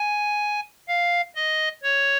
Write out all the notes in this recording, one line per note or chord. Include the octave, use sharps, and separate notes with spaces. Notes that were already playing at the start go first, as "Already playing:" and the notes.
Already playing: G#5
F5
D#5
C#5